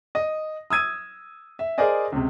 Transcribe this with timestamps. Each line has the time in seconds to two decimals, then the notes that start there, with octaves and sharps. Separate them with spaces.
0.15 D#5
0.70 D#6 E6 G#6 D#7
1.59 E5
1.78 G#4 A#4 C5 D5 D#5 G#5
2.12 C#2 C3